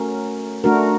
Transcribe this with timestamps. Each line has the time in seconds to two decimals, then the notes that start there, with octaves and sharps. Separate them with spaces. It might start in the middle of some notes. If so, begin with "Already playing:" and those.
Already playing: A3 C#4 F#4 A#4
0.64 A3 D4 F#4 A#4